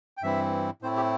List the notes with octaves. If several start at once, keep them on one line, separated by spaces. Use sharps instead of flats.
G5
G2 E3 C4 E4 E5
A2 A3 C4 E4 C5
G4